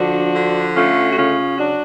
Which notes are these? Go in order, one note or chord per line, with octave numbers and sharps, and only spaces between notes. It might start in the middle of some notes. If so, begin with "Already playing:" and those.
Already playing: D3 F3 D4 F#4
D3
A3 C#4 F4
F#4
C#3 C#4 F4
F#3 D4 F#4